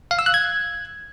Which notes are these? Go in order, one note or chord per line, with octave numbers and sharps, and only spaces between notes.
F5
E6
F#6
G#6